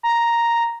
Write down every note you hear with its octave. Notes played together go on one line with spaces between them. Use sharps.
A#5